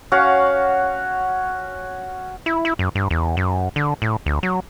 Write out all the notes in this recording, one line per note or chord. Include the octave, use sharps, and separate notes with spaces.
C#4 F#4 F5 F#5
E4
E4
F#2
G2
E2
F#2
D3
A2
D2
F#3